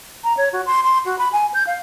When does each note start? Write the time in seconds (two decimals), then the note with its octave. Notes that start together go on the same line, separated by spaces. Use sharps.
0.24 A#5
0.37 C#5
0.53 F#4
0.66 C6
0.84 C6
1.05 F#4
1.18 B5
1.33 G#5
1.54 G6
1.67 F5